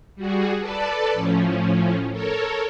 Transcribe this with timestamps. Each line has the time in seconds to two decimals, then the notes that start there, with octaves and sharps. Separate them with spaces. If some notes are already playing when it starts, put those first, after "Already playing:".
0.16 G3 F#4 G#4
0.60 A4 B4 D5 A5
1.13 A2 F3 C#4
2.12 A4 A#4 C#5